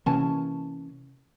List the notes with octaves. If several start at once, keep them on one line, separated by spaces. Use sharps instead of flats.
C3 E3 A#3 C#4 G#5 A5